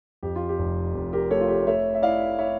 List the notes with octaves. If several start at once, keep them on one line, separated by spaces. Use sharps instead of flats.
F2 G4
F4
G4
F1
F1
G4 A#4
A3 A4 C#5
F4
G4
A3 C#5 E5
E5
E4 D5 F5
E4 C#5 E5